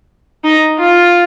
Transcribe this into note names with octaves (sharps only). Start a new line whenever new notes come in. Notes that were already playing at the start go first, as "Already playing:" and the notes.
D#4
F4